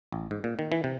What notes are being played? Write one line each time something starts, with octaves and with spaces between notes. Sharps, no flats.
A1
G#2
A#2
D#3
E3
C3